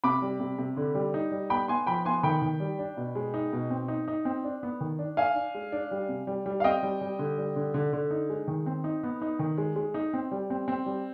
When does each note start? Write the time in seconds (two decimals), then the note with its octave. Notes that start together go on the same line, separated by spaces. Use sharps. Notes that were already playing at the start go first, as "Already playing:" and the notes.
0.04 C3 B5 D6
0.22 G3
0.40 C3
0.58 C3
0.77 D3
0.95 G3
1.14 D#4
1.31 G3
1.50 B3 G5 B5
1.68 B3 G#5 C6
1.86 F3 G5 B5
2.05 B3 G#5 C6
2.23 D#3 G5 B5
2.42 D#3
2.60 G3
2.79 D4
2.97 B2
3.15 G#3
3.34 D#4
3.53 B2
3.70 C4
3.88 D#4
4.08 D#4
4.25 C4
4.44 D4
4.63 B3
4.80 D#3
4.99 D4
5.17 D4 F5 G#5
5.35 D4
5.54 G#3
5.72 D4
5.91 G3
6.09 C3
6.27 G3
6.46 G3
6.60 F5
6.64 C4 D#5 G5
6.83 G3
7.01 G3
7.19 D3
7.38 G3
7.56 D3
7.74 D3
7.93 D3
8.10 D#4
8.29 G#3
8.48 D#3
8.66 C4
8.84 D#4
9.03 B3
9.22 D#4
9.39 D#3
9.58 G#3
9.76 G#3
9.94 D#4
10.14 C4
10.31 G3
10.50 C4
10.68 C4
10.86 G3